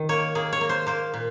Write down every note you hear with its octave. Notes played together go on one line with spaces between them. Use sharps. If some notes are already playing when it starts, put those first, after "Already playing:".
Already playing: D#3
A#3 C#5
A#3 G#4
C#5
A#3
C5
A#3 C5
A#2